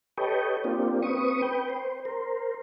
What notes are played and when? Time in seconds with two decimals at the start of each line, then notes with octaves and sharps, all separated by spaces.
0.18 G4 A4 B4 C#5 D#5 G5
0.64 A#3 C4 D4 F4 G4
1.02 C4 B4 C#6 D#6
1.42 B4 G5
1.70 C5
2.05 A#4 C5